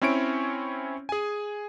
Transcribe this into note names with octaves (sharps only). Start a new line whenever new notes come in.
C4 C#4 E4 C#5 C#6 D7
G#4 G#5